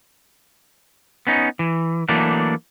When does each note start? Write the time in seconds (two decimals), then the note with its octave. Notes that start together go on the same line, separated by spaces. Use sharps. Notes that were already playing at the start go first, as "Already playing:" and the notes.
1.27 B3 C#4 D#4
1.59 E3
2.09 E3 F#3 A3 A#3 D4